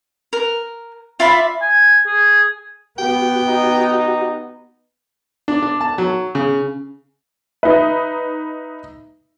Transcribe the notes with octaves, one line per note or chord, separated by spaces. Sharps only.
A#4
F4 D5 E5 B5
G#5
G#4
B3 F#4 G4 G5
D#4
D4
D4
A5
F#3
C#3
D#4 B4 E5